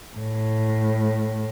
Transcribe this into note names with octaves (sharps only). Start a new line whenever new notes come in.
A2